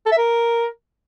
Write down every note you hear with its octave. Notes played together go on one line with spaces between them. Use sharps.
A4
E5
A#4